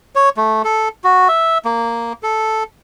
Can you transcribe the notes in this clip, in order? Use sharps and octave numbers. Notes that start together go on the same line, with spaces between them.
C#5
A3
A4
F#4
E5
A#3
A4